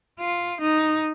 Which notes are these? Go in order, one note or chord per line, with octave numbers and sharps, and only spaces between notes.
F4
D#4